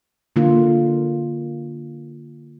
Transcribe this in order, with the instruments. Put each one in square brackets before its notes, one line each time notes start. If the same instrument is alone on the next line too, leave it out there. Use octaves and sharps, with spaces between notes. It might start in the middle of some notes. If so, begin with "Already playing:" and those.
[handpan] D3 A#3 F4